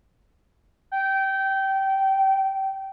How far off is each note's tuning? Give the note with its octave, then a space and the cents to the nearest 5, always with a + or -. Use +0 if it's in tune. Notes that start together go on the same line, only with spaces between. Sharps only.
G5 -20